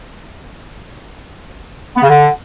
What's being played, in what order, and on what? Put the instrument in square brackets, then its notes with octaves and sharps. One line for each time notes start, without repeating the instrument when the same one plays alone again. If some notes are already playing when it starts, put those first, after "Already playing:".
[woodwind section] B3
C#3
D3